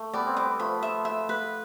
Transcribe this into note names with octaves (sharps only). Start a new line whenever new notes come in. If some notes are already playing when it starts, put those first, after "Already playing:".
Already playing: A3
G3 B3 D5
C4
G3 B3 D6
F3 A3 B5
E5
E5
B4